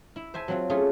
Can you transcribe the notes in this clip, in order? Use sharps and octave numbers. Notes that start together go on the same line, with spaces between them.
E4
C5 E5 G#5 A5
F#3 C4 F4
A3 C#4 F4 G#4